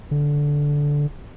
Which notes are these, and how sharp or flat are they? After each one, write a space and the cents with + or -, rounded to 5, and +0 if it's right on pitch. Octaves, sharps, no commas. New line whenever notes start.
D3 -10